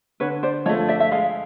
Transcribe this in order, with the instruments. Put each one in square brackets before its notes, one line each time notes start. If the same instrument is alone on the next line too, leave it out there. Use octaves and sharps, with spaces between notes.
[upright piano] D3 [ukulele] B4 C#5
[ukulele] C5 D5
[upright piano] F3 [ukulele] C#5 D#5
[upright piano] A3
[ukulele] D5 E5
E5
[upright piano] G#3 [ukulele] D#5 F5